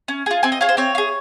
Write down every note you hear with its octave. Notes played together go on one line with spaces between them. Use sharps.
C#4
F4 G#4
C4 G#5
D#5
F4 G#4 C#5
C5
C4 C#5
F4
G#4